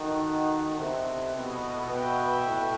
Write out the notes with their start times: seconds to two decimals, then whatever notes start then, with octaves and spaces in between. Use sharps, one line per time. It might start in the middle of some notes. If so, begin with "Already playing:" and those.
Already playing: D#3 F#4 A4 D#5 F#5
0.77 C3 B3 E4 A4 D#5 F#5
1.34 B2
1.89 B2 F#4 B4 E5 G5
2.46 A2